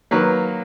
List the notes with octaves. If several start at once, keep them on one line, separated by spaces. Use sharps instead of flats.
D#3 F#3 A#3 B4